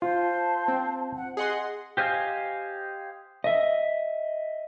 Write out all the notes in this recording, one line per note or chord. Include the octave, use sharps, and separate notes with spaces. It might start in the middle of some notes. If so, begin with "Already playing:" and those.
F4 C5 A5
C4
F#5
G#4 D#5 F#5 C6
G4 C5 D#5 F5 G#5
D#5 E5